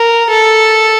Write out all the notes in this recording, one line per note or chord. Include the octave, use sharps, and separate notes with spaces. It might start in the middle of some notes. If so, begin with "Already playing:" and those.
Already playing: A#4
A4